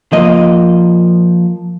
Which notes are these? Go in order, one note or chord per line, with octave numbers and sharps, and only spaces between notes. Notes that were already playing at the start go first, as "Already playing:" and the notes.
F3 A#3 D#5